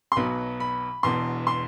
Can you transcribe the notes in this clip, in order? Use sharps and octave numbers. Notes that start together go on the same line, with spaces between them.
C6
B1 B2 F#3 B3 B5
B5
E1 E2 B2 C6
C6